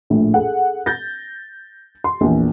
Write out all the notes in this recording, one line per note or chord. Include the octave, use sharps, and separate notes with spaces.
A#1 A2
G#4 A4 F#5
G6 A6 A#6
C6
A#1 E2